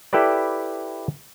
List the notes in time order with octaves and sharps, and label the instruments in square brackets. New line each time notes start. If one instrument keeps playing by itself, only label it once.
[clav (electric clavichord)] E4 G4 A4 B4 D5